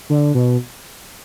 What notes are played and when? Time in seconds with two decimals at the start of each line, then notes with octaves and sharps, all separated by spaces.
0.10 D3
0.35 B2